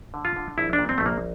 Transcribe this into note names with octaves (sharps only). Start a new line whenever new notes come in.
D3
F4
D3
A#1 E4
D4
A#2
C4
A3
A#1 A#3